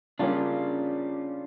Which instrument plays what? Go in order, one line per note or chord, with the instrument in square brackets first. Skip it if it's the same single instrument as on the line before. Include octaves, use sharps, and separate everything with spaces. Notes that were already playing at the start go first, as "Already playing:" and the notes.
[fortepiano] C#3 G3 A#3 C#4 [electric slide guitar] D4 F4